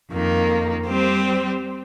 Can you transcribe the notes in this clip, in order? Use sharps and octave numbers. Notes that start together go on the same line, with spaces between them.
F2 D#3 A#3
G3 C4 G4 C5